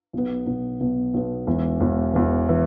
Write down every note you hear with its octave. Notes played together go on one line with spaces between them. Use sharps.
B1 B2 B3
B1 B2 B3
B1 B2 B3
B1 B2 B3
E1 E2 E3
E1 E2 E3
E1 E2 E3
E3